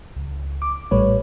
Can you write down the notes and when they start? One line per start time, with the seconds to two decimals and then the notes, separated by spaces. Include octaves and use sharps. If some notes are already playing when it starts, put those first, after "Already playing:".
0.16 C#2
0.62 D6
0.91 A#1 A2 G3 A3 B4 C#5